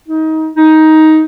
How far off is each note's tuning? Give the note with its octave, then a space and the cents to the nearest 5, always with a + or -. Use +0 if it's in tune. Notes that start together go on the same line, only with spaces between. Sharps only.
D#4 +25
D#4 +10